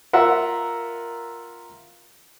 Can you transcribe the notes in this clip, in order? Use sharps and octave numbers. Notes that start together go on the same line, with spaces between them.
F4 A#4 E5 F#5